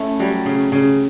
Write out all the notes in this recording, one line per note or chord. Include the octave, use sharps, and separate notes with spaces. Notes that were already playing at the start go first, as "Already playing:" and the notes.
Already playing: A3 C#4 E4
F#3 G3
C#3
C#3